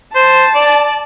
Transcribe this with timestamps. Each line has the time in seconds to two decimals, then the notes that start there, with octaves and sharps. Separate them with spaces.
0.15 C5 A5
0.55 D5